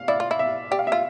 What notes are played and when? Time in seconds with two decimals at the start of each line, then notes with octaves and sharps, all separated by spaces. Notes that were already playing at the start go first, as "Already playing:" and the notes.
Already playing: F5
0.08 E4 D5
0.20 F4
0.31 E4
0.39 E5
0.71 G4 D5
0.79 F5
0.87 E5
0.92 F4